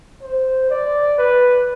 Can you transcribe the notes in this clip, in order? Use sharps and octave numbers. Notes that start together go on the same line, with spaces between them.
C5
D5
B4